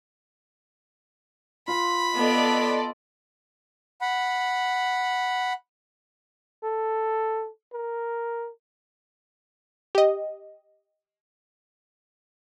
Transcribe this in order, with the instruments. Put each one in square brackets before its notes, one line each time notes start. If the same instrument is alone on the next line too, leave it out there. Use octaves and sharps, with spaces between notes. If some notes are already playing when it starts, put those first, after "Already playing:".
[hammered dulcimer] F4 B4 [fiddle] B5
[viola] B3 [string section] A4 D5 D#5
[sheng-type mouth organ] F#5 B5
[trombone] A4
A#4
[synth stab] G4 D#5